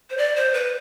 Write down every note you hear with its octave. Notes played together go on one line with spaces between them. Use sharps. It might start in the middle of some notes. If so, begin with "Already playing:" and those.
C5
D5
C5
B4